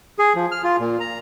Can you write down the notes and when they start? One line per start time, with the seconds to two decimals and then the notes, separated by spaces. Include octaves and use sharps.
0.19 G#4
0.35 F3
0.52 F6
0.64 F4
0.80 A#2
1.00 A#5